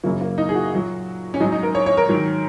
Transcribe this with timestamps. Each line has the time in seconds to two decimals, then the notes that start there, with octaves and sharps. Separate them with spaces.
0.04 F#2 C#3 F#3 A#3
0.21 A#3
0.38 D#4
0.49 G#4
0.55 F#4
0.72 A#2 F#3
1.34 C#4
1.40 G#2 F#3 D#4
1.52 D#4
1.63 A#4
1.75 C#5
1.86 C#5
1.97 A#4
2.09 G#2 D#3 F#3